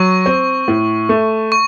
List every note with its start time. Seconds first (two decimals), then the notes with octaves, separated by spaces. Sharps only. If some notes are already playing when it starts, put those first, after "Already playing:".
Already playing: F#3 C#6
0.26 C4
0.68 A2
1.09 A3
1.52 C#6